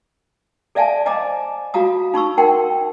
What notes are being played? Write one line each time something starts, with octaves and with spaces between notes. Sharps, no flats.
A4 D5 E5 F5 G#5 A5
C5 D#5 G#5 A#5 D6
F4 F#4 F5 A#5 D#6
D#4 B5 C#6 E6
D#4 A#4 F#5 G5 C6